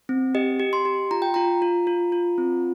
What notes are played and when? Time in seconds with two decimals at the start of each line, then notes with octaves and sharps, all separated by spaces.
0.09 C4
0.35 G4 D#5
0.60 G4
0.73 C6
0.85 G4
1.11 F4 A#5
1.22 G5
1.34 F4 A#5
1.62 F4
1.87 F4
2.12 F4
2.38 C4